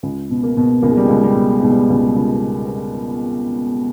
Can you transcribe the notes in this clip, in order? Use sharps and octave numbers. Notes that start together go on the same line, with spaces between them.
C#2
B2
A#3
B2
C#2 A#3
G#3
G3
C#2 G#3
G3
B2
B2 G#3
G3
G#3
C#2
G#3
C#2